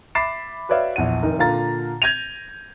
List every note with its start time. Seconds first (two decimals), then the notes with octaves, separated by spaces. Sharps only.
0.15 E5 B5 D6 A6 C7 E7
0.69 F#4 B4 C#5 D5 E5 F5
0.96 A#1 E2 F#5 D#7
1.23 F1 D#3 D#4 A#4
1.39 A#2 D3 F5 A#5 A6
2.02 G6 G#6 A#6 D#7 F7